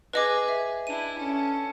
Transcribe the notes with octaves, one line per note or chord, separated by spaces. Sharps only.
G#4 B4 D#5 D6
E5
D4 E4 D#7
C#4 A4